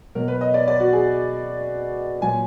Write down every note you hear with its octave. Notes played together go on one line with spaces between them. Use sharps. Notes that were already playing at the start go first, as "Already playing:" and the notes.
B2 F#3 A#4
B4
D#5
D5
D5
F#4
G#4
A#2 F#3 G#5